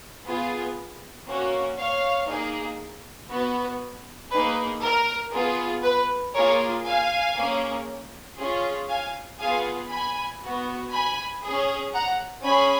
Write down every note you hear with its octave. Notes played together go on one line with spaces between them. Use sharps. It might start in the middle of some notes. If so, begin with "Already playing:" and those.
B3 F4 G#4
A#3 C#4 F#4
C#5 F5
A#3 D#4 G#4
B3 F#4 B4
A#3 D#4 G#4 B4
A#4
B3 F4 G#4
B4
A#3 F4 G#4 A#4 C#5
F5 G#5
A#3 C#4 G#4
C#4 F4 G#4
F5 G#5
B3 F4 G#4 F5 G#5
G#5 B5
B3 F#4
G#5 B5
G#4
C#4
F#5 A#5
C#4 G#4 G#5 B5